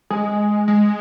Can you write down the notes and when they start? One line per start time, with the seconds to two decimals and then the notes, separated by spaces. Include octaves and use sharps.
0.10 G#3
0.68 G#3